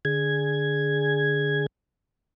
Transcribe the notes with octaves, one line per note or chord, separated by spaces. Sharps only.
D3 G#4 G#6